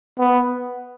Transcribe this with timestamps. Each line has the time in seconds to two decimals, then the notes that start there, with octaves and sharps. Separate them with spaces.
0.19 B3